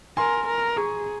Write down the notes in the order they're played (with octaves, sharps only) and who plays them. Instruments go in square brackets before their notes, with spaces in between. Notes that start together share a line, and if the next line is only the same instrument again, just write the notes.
[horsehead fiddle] A#4 [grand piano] G#5 C6
[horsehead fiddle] A#4
[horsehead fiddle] G#4 [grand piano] A#5 C#6